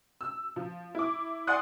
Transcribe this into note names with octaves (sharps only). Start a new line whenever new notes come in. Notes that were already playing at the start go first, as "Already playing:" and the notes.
E6
F3
E4 D6
D5 F#5 G#5 C6 D#6 F#6